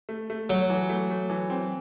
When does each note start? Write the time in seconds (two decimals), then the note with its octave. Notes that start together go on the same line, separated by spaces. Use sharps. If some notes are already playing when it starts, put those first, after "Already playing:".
0.09 A3
0.30 A3
0.50 F#3 A3
0.70 E3
0.89 A3
1.10 A3
1.30 E3
1.50 C4